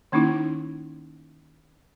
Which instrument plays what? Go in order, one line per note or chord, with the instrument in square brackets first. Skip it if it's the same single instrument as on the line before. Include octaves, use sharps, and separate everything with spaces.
[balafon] D#3 A#3 C#4 D#4 E4